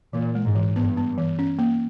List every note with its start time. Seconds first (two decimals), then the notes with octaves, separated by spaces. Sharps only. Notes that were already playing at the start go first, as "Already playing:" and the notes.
0.13 A#2 E3
0.35 G#3
0.45 G#2
0.55 E3
0.76 G2 B3
0.97 B3
1.18 E3
1.39 C#4
1.59 A#3